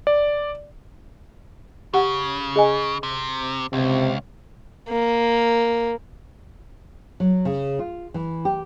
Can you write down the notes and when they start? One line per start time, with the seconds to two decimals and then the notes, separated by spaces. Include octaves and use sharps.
0.07 D5
1.94 C#3 G4 F#5
2.56 G#4 D#5 G#5
3.03 C3
3.73 C#2 C3
4.88 A#3
7.20 F#3
7.45 C#3
7.79 F4
8.14 E3
8.45 G4